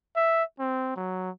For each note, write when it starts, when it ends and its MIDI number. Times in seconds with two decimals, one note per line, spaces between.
0.16 0.44 76
0.60 0.95 60
0.96 1.30 54